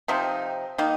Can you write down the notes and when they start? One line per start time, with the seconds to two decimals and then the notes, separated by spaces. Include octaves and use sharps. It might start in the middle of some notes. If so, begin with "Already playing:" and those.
0.08 C3 F3 C4 D#4
0.78 D#3 A#3 D#4